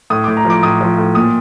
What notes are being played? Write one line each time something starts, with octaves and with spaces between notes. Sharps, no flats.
A2 D#6
D6
A2
A#5
F3 D6
A2 D#6
F3
A2
A#2 D#6